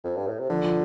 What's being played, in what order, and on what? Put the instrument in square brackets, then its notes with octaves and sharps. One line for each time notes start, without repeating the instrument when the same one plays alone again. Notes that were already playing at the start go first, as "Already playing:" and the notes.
[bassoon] F2
G2
A2
C3
[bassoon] D3 [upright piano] F3
[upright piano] F3